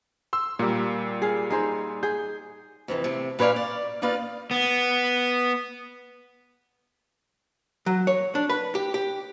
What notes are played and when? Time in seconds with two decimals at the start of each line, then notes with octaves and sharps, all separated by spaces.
0.33 C6 E6
0.59 A#2 G3 A#3
1.22 G#4 F5
1.50 D#4 G#4 C5
2.03 G#4 G6
2.88 F2 C3 E3
3.04 C3 A3
3.39 A#2 B4 C#5 D5 F5
3.56 D5
4.02 A#3 D#4 F4 B4 D5 F5
4.51 B3
7.86 F#3
8.07 C#5
8.35 D4
8.49 B4
8.75 G4
8.94 G4